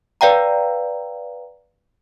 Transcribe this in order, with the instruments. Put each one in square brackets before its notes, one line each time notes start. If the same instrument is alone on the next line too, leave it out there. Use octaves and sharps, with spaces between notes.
[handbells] B4 D5 F5 G5 A#5